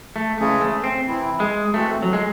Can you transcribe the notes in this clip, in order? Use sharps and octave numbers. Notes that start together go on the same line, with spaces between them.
A3
C#3 E3 G#3 A3 C#4 G#4
A3
C4
C3 E3 C4 E4
G#3
E3 A3 C4 F#4 A4
F#3
G#3